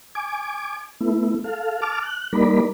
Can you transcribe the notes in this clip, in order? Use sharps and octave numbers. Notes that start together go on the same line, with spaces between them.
G#5 D6
A3 B3 E4
A4 F5
A5 D6 F6
F#6
G3 A#3 D#4 A#4 D5 B5